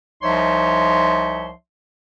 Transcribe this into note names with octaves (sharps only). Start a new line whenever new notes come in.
C2 F3 D#4 C#5 E5 C6